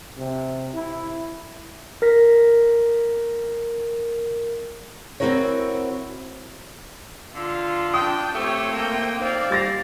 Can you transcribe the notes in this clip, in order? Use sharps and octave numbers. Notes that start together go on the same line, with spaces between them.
C3
E4
A#4 A#6 B6
C4 C#4 E4 F#4 A#4 C#5
D3 F4
D4 G5 D#6
A3 C4 G4 C#5
A#3 G5
C4 D#4 D5 F5
G3 A6 A#6